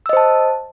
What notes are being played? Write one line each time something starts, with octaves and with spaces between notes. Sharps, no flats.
C5 D#5 A5 E6